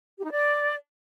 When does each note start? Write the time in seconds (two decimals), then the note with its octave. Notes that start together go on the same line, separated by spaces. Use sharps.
0.17 G4
0.24 D#4
0.31 D5